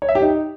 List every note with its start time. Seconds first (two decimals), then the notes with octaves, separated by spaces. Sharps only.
0.02 C#5
0.09 E5
0.15 G4
0.22 D#4